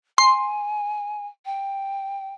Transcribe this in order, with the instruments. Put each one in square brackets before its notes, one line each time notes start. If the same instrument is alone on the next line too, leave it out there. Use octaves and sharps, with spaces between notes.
[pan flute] G#5 [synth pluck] C6
[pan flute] G5